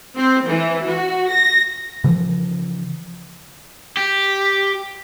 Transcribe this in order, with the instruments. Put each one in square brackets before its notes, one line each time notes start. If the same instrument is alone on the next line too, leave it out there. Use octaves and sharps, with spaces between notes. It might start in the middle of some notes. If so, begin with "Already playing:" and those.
[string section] C4
E3
F#4
A#6
[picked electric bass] C#3 E3 F3
[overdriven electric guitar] G4